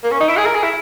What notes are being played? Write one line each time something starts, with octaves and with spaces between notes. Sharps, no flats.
A#3
C#4
D#4
E4
G#4
A#4
G#4
E4